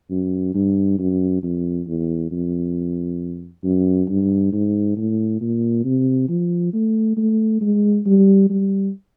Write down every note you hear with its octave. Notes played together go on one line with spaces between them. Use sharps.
F#2
G2
F#2
F2
E2
F2
F#2
G2
G#2
A2
A#2
C3
F3
A3
A3
G#3
G3
G3